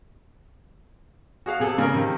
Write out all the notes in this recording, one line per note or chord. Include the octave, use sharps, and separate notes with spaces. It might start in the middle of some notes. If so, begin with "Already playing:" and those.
F#4 G#4 F5
C3 G#4 A4
C#3 A#4
C3 D#3